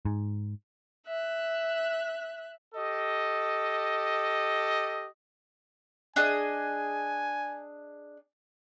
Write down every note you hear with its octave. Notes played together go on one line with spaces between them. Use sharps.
G#2
E5 F#6
G4 A4 D#5
D4 G#4 D#5 G#5